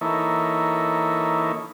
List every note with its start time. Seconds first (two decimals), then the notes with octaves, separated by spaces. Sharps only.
0.01 E3 A#3 D#4 E4 A4 C#5